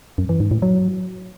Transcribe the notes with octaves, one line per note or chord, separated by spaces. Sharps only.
F#2
E3
G#2
A2
F#3